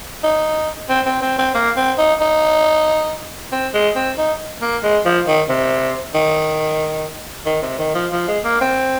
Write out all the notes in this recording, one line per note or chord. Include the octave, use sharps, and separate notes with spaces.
D#4
C4
C4
C4
C4
A#3
C4
D#4
D#4
C4
G#3
C4
D#4
A#3
G#3
F3
D#3
C3
D#3
D#3
C3
D#3
F3
F3
G#3
A#3
C4